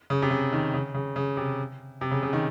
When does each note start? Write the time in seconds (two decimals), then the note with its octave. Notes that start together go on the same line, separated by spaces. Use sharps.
0.10 C#3
0.22 C3
0.31 C#3
0.53 D#3
0.74 C#3
0.94 C#3
1.16 C#3
1.37 C3
2.01 C3
2.11 C#3
2.23 C#3
2.33 D#3